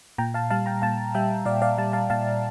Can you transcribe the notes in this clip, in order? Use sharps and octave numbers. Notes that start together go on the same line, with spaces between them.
A#2 G5 A#5
F5 A5
G3 F5 A5
G5 A#5
A#2 F5 A5
G3 E5 G5
A#2 D5 F5
D5 F5
G3 F5 A5
F5 A5
A#2 F5 A5